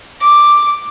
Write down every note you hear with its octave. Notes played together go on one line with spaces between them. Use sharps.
D6